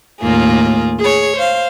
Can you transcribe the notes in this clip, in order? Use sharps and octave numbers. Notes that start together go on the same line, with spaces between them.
D#2 A2 A#3 F4 G#4
G#4 C#5
C5 F5